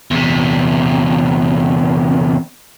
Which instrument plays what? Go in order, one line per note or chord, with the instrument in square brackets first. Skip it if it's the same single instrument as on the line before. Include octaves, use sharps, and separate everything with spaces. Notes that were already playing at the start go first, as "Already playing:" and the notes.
[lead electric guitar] E2 C3